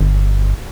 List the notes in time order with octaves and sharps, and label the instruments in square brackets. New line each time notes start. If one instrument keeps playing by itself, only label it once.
[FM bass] G1